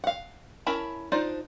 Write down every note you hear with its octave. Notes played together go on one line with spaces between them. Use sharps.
F5 F#5
C#4 E4 A#4 A5 B5
D4 D#4 F4 C5 D5